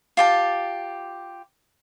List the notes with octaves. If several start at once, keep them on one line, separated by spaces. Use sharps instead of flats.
F4 G4 A5